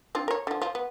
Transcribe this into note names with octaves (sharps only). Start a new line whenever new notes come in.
C4 D4 F4
A#4 C#5
D3 F3
F3
B3